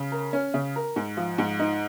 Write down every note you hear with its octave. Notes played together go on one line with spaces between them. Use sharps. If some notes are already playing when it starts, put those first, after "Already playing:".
Already playing: C#3
A#4
C#4
C#3
A#4
G#2
F3
G#2
D#4